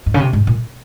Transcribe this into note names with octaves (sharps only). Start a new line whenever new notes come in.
G#2
C#3
C3
G#2
A#2